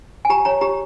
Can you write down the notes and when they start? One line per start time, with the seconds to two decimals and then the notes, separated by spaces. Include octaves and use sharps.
0.25 G#5
0.30 G4 A#5
0.45 C#5 A#5
0.61 G4 A#5